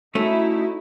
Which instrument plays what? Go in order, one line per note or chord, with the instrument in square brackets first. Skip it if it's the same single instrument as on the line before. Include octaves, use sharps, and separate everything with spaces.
[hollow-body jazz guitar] A3 C#4 [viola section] D#4 E4 [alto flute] F#4